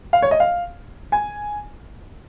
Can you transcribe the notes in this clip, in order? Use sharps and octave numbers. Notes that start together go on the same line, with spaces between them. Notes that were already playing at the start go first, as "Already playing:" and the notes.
F5
C#5
D#5
F5
G#5